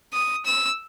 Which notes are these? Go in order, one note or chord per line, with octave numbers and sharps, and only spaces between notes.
D#6
E6